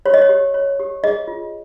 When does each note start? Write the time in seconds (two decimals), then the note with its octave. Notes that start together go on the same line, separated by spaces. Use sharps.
0.06 G4 C#5
0.14 D#5
0.22 C#5
0.29 G4
0.54 C#5
0.79 G4
1.04 G#4 D#5
1.28 F4